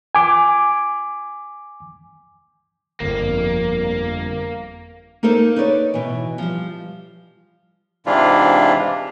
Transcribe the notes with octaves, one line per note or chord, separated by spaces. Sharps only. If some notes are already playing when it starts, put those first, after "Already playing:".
G#5 D6
G1 F2 A#3
A#3 D#4 A4 A#4 C5
D#4 B4 C#5 D5
B2 E3
F3 G3
G#2 C3 E3 D4 E4 F4